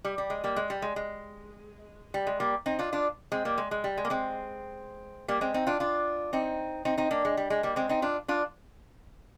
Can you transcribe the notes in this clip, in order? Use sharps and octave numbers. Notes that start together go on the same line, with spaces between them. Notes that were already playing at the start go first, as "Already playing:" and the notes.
G3
G3
G#3
G3 A#3
G#3
G3
G#3
G#3
G3
G#3
G3 A#3
C4 D#4
D4 F4
D4 F4
G#3 C4
G3 A#3
G#3
G#3
G3
G#3
A#3
G#3 C4
G3 A#3
G#3 C4
C4 D#4
D4 F4
D4 F4
C4 D#4
C4 D#4
C4 D#4
A#3 D4
G#3
G3
G#3
G3 A#3
G#3 C4
C4 D#4
D4 F4
D4 F4